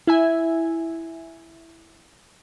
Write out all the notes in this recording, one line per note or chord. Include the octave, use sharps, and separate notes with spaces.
E4 E5 G#5